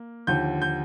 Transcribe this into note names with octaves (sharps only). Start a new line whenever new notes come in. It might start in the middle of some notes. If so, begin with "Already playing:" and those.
Already playing: A#3
D#2 D3 F3 G6
G6